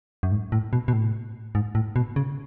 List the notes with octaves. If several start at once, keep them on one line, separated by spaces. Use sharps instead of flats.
F#2
G#2
A2
B2
B2
A2
G#2
A2
B2
C#3